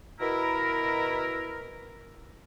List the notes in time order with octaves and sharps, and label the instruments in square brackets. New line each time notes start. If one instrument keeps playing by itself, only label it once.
[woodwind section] B2 E4 A#4